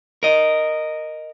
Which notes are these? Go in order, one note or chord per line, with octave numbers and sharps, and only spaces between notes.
A#4 D#5